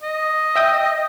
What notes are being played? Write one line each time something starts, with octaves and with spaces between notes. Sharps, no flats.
D#5
E5 G5 D#6